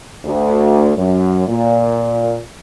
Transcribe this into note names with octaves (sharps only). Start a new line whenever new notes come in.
D2
F#2
A#2